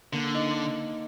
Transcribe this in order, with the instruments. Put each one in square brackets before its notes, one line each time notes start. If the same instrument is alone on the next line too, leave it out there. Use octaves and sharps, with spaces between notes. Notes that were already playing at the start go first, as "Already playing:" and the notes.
[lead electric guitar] D3 [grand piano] A#3
[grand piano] D#4